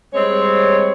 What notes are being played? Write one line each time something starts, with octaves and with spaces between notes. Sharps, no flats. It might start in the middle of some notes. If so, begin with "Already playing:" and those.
G3 G#3 C4 C#5